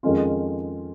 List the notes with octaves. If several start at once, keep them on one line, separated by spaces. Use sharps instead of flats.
F2 D#3 G#3 C#4 F4